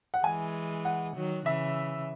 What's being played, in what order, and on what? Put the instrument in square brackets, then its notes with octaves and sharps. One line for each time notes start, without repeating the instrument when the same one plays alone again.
[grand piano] F#5
[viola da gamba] E3 G#3 [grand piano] G#5
[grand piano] F#5
[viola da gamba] D#3 F#3
[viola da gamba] C#3 E3 [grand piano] E5